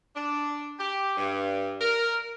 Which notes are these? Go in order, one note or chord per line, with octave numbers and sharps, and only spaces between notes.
D4
G4
G2
A#4